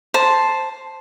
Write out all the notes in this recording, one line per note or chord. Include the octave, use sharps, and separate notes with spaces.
C5 A5